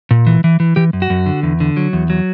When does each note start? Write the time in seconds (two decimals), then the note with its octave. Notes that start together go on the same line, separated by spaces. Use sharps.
0.11 A#2
0.27 E3
0.44 E3
0.60 E3
0.76 E3 G4
0.93 F#2
1.02 F#4
1.10 F#2
1.26 D3
1.43 E2
1.60 D3
1.77 F#3
1.93 E2
2.10 F#3